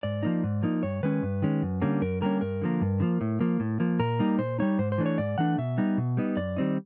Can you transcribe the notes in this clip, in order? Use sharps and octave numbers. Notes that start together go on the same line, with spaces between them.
G#2 D5
F3 A#3 D#4
G#2
F3 A#3 D#4
G2 C#5
D#3 G#3 C#4 B4
G2
D#3 G#3 C#4
F#2
D3 G3 A#3 C#4
F#2 A#4
D3 G3 A#3 C#4 A#4
G2 A#4
D3 F3 A#3
G2
D3 F3 A#3
A2
F3 A#3
A2
F3 A#3
A#2 A#4
G3 A#3 D#4
A#2 C5
G3 A#3 D#4 C#5
G#2 C5
C5
E3 A3 D4
C#5
G#2 D5
E3 A3 D4 F#5
B2 E5
G3 B3 D#4
B2
G3 B3 D#4
F#2 D5
D#3 G3 C4 D#4